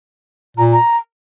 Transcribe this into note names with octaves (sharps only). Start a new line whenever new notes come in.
A#2 A#5
A#5